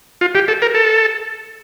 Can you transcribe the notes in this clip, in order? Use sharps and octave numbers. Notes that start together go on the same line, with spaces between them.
F4
G4
A4
A#4
A4